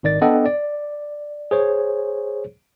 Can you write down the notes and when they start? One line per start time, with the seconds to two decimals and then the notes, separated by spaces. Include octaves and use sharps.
0.03 G#1 D#3 D5 A6
0.21 B3 D4 A4 D#5 F#5 G5
0.46 D5
1.51 G#4 C5 C#5